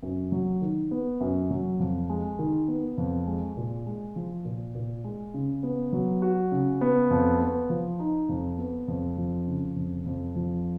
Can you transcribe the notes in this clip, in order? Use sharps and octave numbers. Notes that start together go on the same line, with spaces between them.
F#2
F#3
D#3
B3
F#2
F#3
F2
G#3
D#3
B3
F2
G#3
A#2
G#3
F3
A#2
A#2
G#3
C#3
B3
F#3
F#4
C#3
B3
F2
B3
F3
D#4
F2
B3
F2
F3
C#3
F2
F2
F3